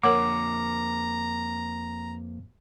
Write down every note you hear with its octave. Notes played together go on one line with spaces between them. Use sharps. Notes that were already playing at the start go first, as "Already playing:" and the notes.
F2 A#3 A#4 C#5 F#5 A#5 D6